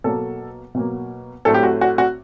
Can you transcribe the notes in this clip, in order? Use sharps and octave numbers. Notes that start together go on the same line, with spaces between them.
B2 F#3 A#3 A4
B2 F#3 A#3
A2 F#3 A3 C4 A4
G4
F#4
F#4
F#4